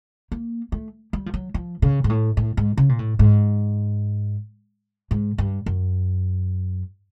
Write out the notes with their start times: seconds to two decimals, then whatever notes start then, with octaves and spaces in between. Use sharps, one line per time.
0.32 A#3
0.72 A3
1.13 G3
1.26 F3
1.34 F#3
1.54 F3
1.82 C#3
2.04 G#2
2.09 A2
2.37 A2
2.57 G#2
2.77 C#3
2.89 A#2
2.99 A2
3.19 G#2
5.11 G#2
5.38 G2
5.66 F#2